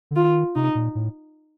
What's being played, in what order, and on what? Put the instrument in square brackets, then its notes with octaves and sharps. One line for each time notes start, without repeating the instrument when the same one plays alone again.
[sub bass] D3
[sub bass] D#3 [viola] F4
[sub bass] C3 [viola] D#4
[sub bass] A#2
A2